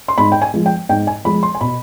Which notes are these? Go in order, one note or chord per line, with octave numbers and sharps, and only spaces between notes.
C6
G#2 B5
G5
G#5
F3 G#3
G5
G#2 G5
G#5
F3 G#3 B5
C6
G#5
B2 B5